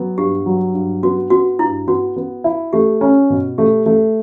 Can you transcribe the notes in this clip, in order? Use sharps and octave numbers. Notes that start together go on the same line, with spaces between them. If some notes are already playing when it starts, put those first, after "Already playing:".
Already playing: F#3 B3
G2 G4
F#3
G2
B3 F#4
B3 F#4
G2 E4
B3 F#4
B3
E4
A3 G4
C#4
B2
A3 G4
A3